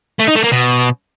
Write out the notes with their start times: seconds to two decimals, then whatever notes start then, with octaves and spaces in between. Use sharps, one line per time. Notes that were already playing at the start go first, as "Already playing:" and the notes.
0.20 A3
0.28 D#4
0.36 A3
0.44 A#3
0.52 B2